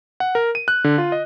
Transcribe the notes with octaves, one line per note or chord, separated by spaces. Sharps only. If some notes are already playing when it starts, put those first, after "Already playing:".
F#5
A#4
D#7
F#6
D3
F4
D#5